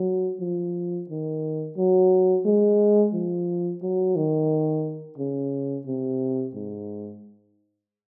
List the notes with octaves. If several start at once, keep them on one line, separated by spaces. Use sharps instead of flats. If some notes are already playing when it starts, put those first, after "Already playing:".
Already playing: F#3
F3
D#3
F#3
G#3
F3
F#3
D#3
C#3
C3
G#2